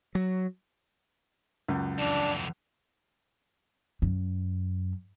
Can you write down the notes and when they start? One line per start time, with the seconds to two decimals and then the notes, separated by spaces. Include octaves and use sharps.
0.15 F#3
1.68 C#2 F#2
1.99 F2 E3 D4
4.02 F#2